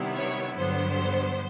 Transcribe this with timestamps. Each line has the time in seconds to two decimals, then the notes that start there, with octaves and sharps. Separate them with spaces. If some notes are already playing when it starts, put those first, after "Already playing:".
Already playing: C3 D#3 G3 B3 E4
0.14 C#5
0.56 G2 D3 F#3 B3 C5